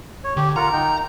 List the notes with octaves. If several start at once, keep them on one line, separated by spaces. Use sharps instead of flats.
C#5
D3 G4
F4 A#4 F#5 A#5
D#4 G5